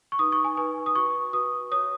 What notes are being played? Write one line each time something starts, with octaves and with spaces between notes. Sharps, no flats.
C#6
D#4 B4 D#6
C#6
G#5
D#4 B4 G#5
D#6
F#4 B4 C#6
F#4 B4 D#6
F#4 C#5 D#6